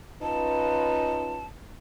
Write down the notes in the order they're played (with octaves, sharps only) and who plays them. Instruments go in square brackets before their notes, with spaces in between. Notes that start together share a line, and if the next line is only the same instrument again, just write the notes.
[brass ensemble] C#4 F4 B4 [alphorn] D#4 [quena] A5